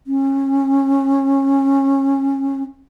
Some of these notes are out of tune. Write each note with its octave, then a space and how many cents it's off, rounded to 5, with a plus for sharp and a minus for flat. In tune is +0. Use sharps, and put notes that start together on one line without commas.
C#4 -25